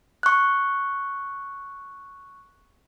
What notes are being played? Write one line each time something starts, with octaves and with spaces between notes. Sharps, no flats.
C#6 F#6